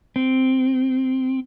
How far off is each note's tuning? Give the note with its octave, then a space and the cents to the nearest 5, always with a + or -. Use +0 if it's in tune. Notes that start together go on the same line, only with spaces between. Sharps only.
C4 -5